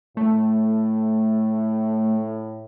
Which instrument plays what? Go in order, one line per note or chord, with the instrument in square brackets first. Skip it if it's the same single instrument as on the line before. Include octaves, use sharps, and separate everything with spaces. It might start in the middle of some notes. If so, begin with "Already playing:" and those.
[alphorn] A2 [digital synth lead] A3